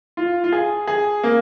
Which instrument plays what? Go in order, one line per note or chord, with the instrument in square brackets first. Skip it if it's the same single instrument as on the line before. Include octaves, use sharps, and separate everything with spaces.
[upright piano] F4
F4
G#4
G#4
A#3